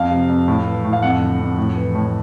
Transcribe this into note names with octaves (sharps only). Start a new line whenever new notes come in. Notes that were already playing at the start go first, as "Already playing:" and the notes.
Already playing: F2 F5
C3
F2
A2
E3
A2
F5
F2 F#5
D3
F2
A2
E3
A2